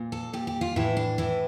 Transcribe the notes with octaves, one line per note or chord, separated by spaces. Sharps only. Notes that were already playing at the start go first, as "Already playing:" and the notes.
Already playing: A#2
A4
A#2 G4
G4
F4
A2 E3 E4
D4
A2 E3 E4